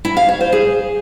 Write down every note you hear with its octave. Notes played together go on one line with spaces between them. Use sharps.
E4
F5
C#5
C5
G#4